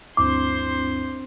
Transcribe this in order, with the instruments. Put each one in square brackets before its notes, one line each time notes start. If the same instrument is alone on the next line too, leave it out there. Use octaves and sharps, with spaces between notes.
[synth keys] D2 G2 E4 [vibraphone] C4 D4 [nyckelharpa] C5 C6 [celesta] D6